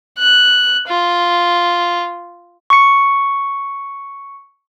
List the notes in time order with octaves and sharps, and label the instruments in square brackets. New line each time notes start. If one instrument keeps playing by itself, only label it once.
[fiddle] F#6
F4
[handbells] C#6 C#7